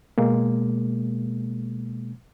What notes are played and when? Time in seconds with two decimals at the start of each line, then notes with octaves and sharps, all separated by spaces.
0.18 B2 G#3 A#3